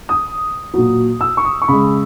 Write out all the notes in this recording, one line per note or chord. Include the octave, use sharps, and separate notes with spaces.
D#6
A#2 F#3
E6
C#6
D#6
C#6
C#3 G#3 B5